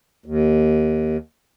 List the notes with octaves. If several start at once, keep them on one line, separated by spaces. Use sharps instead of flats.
D#2